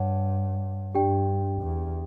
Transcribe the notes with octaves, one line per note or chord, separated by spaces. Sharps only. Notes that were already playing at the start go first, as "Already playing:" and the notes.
Already playing: G2 C#5 F#5 A5
G2 D4 G4 D5 G5
E2